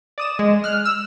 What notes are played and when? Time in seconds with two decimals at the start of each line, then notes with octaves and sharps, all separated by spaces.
0.18 D5 D#6 E7
0.39 G#3
0.64 F6 F#6
0.85 E6